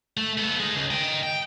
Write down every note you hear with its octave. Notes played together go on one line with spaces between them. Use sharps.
A3
B3 A4
G#3 D#4
C#2
D#5 G5
G5